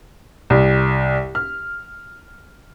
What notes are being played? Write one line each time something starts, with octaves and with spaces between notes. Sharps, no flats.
C2
F6